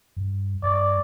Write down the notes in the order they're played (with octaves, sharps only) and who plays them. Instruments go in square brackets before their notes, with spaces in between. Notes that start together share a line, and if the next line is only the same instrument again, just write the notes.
[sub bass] G2
[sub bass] G2 [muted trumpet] D5